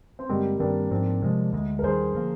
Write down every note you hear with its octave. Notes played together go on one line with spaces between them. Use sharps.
C4
G2 D3 G3 G#3 A#3 C4
G2 D#3 G3 A#3 C4 D4
G#2 F3 C4
C3 F3 G#3
D2 D3 G#3
A#4
D#2 D#3 G3 G#4 C5
D3 F3 A#3